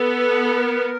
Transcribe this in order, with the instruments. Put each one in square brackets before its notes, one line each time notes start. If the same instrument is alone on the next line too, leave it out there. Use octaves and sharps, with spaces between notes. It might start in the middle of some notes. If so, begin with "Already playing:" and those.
Already playing: [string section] B3 [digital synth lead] A4
[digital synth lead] A4
A#4